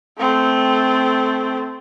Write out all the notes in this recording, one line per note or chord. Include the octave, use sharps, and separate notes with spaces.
A3 C4